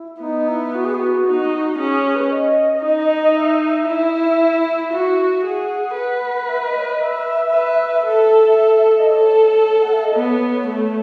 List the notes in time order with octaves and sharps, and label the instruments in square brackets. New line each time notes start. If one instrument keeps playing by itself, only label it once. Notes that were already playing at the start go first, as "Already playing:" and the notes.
Already playing: [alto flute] E4
[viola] B3 [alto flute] D#4
[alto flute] E4
F#4
G#4
F#4
[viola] D#4
[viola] C#4 [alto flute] G#4
[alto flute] G#4
B4
C#5
D#5
[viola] D#4
[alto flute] E5
[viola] E4
F#4
[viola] G#4 [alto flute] F#5
[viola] B4
[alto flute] E5
D#5
C#5
D#5
E5
[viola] B4
[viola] A4 [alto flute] E5
[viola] A4
[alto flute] E5
D#5
[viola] A4 [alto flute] C#5
[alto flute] F#5
E5
D#5
[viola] B3 [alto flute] C#5
[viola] A3